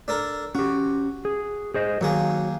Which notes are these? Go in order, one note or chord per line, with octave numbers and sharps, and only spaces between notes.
D4 A4 A#4
C#4 F#4 G4
G#4
G#4 C5 D#5
D#2 F#3 A#3 G#4